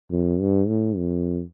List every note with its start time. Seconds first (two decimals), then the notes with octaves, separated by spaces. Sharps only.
0.11 F2
0.40 G2
0.68 A2
0.97 F2